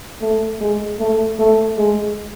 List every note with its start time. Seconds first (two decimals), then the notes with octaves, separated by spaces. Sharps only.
0.21 A3
0.61 G#3
0.99 A3
1.39 A3
1.77 G#3